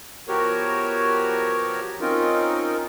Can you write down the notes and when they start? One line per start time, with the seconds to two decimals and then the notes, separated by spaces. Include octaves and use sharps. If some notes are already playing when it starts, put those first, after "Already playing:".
0.28 F3 B3 F#4 G4 A#4 C#5
2.01 C4 C#4 D#4 F4 A#4